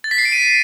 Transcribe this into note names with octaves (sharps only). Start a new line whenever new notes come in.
A6
B6
C7
D7
D#7